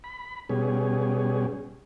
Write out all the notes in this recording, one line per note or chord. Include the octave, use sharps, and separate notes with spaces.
B5
B2 G3 C#4 G#4